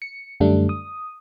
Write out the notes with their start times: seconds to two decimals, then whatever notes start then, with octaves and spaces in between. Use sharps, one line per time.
0.02 C#7
0.40 F#2 D3 G3 A3 D4
0.69 D#6